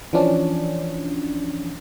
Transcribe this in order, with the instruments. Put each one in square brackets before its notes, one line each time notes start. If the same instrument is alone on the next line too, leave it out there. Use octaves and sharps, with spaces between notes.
[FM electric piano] E3 F3 C#4 D4